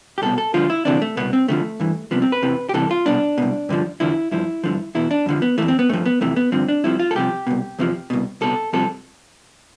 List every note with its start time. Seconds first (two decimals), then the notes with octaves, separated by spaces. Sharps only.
0.18 G4
0.22 C2 B2 A4
0.38 A4
0.54 D2 D3 F3 F4
0.70 E4
0.85 D2 C3 E3 D4
1.02 A3
1.17 C2 B2 B3
1.33 C4
1.48 D2 D3 F3 A3
1.80 G2 E3
2.11 C2 C3 F3 B3
2.22 C4
2.32 B4
2.42 E2 C3 E3
2.69 G4
2.74 C2 C3 E3 A4
2.91 F4
3.06 C2 B2 D4
3.38 C2 B2
3.69 G2 D3 F3
4.00 E2 D3 F3 E4
4.32 G2 F3 E4
4.64 G2 D3 F3
4.95 E2 B2 E4
5.11 D4
5.26 F2 D3 F3
5.42 B3
5.58 F2 E3 A3
5.68 C4
5.79 B3
5.89 G2 F3 A3
6.06 B3
6.21 F2 C3 E3 A3
6.36 B3
6.52 G2 D3 F3 C4
6.68 D4
6.84 C2 C3 F3 E4
6.99 F4
7.11 A4
7.15 C2 C3 F3 G4
7.47 C2 B2
7.79 E2 C3 F3
8.10 C2 B2
8.41 C2 B2 A4
8.73 C2 C3 F3 A4